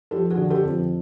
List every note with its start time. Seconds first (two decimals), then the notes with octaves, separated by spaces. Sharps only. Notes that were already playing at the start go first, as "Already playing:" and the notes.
0.11 F3 G4 A4
0.31 F#4 G#4
0.38 D3
0.50 G4 A4
0.64 F2